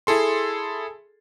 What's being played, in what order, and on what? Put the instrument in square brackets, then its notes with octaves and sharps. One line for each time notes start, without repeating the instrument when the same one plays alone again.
[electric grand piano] E4 G#4 A4 C6